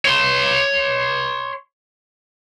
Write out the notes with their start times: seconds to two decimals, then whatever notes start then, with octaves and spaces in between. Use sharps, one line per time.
0.05 C#5 C6